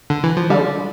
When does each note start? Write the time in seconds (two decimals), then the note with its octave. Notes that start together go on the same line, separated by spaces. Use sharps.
0.10 D3
0.23 E3
0.37 F3
0.50 D3 G3